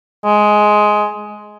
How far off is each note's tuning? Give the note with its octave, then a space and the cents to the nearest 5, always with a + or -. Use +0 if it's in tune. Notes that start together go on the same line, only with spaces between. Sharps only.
G#3 +10